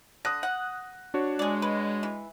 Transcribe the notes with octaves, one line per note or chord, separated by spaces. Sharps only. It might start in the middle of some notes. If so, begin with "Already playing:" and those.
D3 D#6 F#6 A#6
F#5
D4 F#4 C#5
G#3 G#4 D5
B4
E3